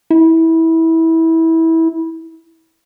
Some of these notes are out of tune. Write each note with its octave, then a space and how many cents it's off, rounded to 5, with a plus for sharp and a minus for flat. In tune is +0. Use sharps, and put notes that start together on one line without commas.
E4 -20